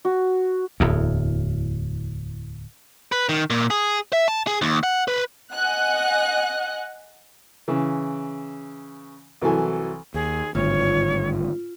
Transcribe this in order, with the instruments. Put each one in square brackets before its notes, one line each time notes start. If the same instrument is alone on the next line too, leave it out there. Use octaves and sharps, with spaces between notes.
[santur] F#4
[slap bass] D1 E2
[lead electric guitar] B4
D#3
A#2
G#4
E5
A5
G#4
D#2
F#5
B4
[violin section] D#5 F#5 G#5 F#6
[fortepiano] C#3 E3
C2 E3 F#3 A4 G#5
[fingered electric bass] D#2 [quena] G#4
[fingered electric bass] G#1 G2 [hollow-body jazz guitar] D2 [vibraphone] F4 [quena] C#5